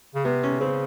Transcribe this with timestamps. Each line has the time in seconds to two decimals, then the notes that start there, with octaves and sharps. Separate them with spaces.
0.15 C#3
0.25 C3 B3
0.43 C#4
0.60 C#3 C4